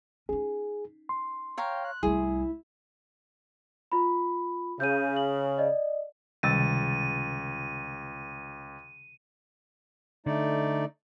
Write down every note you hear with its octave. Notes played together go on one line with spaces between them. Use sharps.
C#4 D#4 G#4
C6
C#5 F5 G5 A#5
F#6
C2 A3 E4 G#4
F4 B5
C#3 G6 D#7
F#7
D5 D#5
C#2 C3 D#3 G3 A6 D#7
D3 A3 D#4 D5